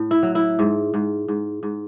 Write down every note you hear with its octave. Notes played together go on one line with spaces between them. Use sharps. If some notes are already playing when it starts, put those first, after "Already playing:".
Already playing: A2
E4
F#3
E4
G#2
G#2
G#2
G#2